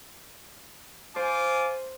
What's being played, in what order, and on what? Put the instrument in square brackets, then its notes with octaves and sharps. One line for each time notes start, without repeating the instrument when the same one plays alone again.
[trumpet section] F4 G#5 D6 [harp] C5